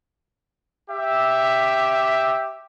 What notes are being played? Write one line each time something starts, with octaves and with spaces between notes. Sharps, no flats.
G4 E5